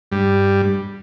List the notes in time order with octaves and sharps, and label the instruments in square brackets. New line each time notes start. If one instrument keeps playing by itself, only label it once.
[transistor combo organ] G2 G3